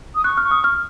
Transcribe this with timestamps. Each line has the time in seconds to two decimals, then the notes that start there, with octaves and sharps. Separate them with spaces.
0.15 D#6
0.24 C#6 F#6
0.37 F6
0.44 C#6
0.51 D#6
0.64 F6